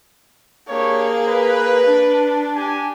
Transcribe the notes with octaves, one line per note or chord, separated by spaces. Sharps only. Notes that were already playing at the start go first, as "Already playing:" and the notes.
A#3 D4 G4 G#4 C#5
B4
D4
G4 G#5